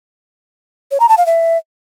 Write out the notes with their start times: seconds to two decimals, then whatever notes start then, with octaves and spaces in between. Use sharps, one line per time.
0.91 C#5
1.00 A#5
1.09 A5
1.17 F5
1.26 E5